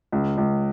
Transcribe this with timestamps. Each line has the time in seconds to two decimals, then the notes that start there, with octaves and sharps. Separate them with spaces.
0.12 C#2
0.37 C#2